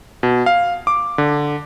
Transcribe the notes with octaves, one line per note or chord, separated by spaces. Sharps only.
B2
F5
D6
D3